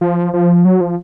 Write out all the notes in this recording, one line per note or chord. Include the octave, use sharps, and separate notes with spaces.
F3
F3
F#3
F3